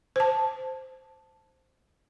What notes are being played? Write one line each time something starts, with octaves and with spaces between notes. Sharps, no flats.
C5 A5